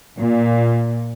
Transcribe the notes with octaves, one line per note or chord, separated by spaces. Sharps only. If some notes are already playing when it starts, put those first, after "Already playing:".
A#2